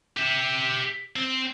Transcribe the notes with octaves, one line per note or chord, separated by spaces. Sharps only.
G4 E5
C4